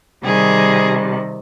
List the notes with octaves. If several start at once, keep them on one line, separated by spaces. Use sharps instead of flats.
C3 D#3 G3 G#4